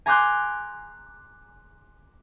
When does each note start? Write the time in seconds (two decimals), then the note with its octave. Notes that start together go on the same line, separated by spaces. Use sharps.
0.06 G#5 A#5 C6 D6 F#6 G6